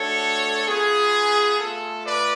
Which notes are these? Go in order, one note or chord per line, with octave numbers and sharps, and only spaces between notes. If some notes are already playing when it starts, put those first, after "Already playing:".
Already playing: A3 D4 F#4 A4 C#5
B3 F4 G#4
A3 F4 A4
B4 D5